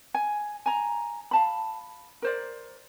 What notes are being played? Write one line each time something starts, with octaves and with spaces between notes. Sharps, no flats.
G#5
G#5 A#5
F5 A5 B5
A#4 C5 D5